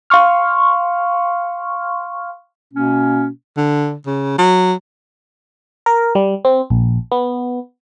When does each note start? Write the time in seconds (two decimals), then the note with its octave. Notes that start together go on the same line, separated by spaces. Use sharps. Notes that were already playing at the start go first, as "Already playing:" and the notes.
0.10 F5 C6 C#6 F6
2.73 B2 A#3 C#4
3.57 D3
4.06 C#3
4.38 F#3
5.86 A#4
6.15 G3
6.45 C4
6.70 A#1
7.12 B3